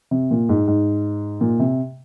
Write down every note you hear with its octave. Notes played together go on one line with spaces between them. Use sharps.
C3
A#2
G#2
G#2
A#2
C3